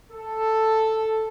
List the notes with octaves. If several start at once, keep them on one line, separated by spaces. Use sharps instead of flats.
A4